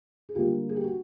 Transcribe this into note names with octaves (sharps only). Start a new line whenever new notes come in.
G#4
D2 D3 G3 A#3 F4 G4
G#4
G4
F#4